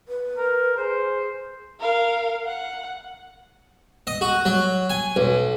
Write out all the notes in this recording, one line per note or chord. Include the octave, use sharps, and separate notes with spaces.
B4
A#4
G#4 C5
A#4 F5
F#5
D#5
F#4
F#3
G#5
B1